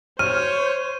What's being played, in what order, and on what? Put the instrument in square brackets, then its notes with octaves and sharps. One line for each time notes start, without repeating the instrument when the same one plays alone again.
[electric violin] C5 [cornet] C#5 [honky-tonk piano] F6 [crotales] D#7